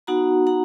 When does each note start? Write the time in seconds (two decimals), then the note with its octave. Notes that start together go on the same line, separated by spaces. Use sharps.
0.07 B3 D#4 F#4 F#5 A#5
0.47 F#5 A#5